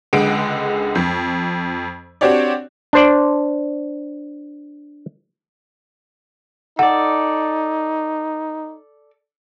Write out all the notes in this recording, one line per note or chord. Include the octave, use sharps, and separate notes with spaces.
C#2 D3 G#3 F#5 D7
F2
C4 D4 F#4 G4 C#5 D5
D4 C5 D5
D#4 A4 D5 F#5